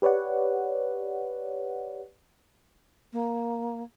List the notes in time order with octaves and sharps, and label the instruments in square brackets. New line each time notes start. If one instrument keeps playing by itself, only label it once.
[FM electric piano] G4 B4 C#5 D5 F#5
[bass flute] A#3